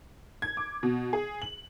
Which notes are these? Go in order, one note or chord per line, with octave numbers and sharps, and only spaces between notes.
G#6
D6
B2
G#4
F#7